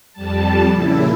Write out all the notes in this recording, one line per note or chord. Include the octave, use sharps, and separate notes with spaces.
F2 G3 A5
A#2 C#3 E4